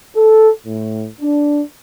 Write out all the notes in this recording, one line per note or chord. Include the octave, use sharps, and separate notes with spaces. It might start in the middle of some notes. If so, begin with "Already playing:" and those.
A4
A2
D4